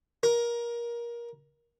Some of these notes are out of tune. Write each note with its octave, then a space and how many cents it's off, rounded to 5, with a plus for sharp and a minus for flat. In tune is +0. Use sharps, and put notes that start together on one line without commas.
A#4 +20